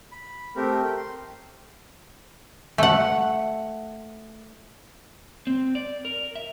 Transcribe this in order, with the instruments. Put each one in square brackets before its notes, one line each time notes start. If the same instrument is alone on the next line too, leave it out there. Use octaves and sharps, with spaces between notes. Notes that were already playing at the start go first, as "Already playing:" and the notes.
[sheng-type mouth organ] B5
A3 C4 G4 A#4
G5
C6
[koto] A3 F#5
[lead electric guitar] C4
D5
A#4
E5